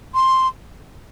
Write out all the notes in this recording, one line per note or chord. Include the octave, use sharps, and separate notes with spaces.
C6